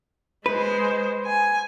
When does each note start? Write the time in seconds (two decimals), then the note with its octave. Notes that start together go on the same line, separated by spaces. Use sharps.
0.46 G#3 B4 C5
1.26 G#5